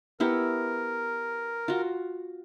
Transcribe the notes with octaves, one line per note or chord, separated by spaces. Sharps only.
B3 E4 G4 A#4
F4 F#4